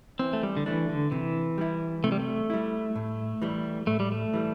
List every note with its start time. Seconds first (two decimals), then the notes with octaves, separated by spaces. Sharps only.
0.19 E3 C4
0.33 A3
0.43 G3
0.57 D3
0.66 E3 A3 D4
0.89 D3
1.11 C3 E3
1.58 G3 E4
2.04 C3 A3
2.12 G3
2.20 A3
2.50 G3 E4
2.95 A2
3.42 E3 G3
3.87 A2 A3
4.00 G3
4.12 A3
4.33 E3 G3